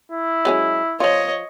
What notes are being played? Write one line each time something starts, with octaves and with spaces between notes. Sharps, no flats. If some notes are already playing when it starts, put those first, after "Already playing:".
E4
F#3 G#3 C#4
F3 F4 C#5 D#5